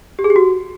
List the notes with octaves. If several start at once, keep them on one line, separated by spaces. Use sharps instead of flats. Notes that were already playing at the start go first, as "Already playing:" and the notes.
G4
G#4
G4
F#4